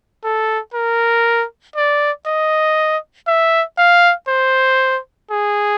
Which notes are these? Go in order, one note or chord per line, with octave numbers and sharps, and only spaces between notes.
A4
A#4
D5
D#5
E5
F5
C5
G#4